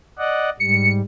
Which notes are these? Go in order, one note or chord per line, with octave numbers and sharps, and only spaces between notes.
D5 D#5 F#5
G#2 G3 C#7